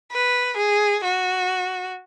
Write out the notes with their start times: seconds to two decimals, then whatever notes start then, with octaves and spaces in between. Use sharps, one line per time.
0.12 B4
0.57 G#4
1.04 F#4